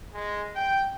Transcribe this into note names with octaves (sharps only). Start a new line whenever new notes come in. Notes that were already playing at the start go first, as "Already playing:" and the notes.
G#3
G5